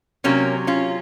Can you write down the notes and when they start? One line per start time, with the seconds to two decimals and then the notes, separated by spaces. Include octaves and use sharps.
0.24 C3 F#3 A#3 C#4
0.67 C#4 F4